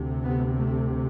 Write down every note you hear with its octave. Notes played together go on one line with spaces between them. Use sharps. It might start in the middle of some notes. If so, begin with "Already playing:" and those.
Already playing: D2 C3
B3
A3